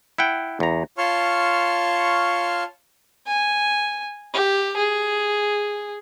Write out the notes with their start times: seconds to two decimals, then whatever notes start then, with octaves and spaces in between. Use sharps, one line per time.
0.18 E4 F#5 G5
0.60 E2 A#5
0.98 F4 C#5 A5 C6 C#6 F6
3.27 G#5
4.33 G4
4.77 G#4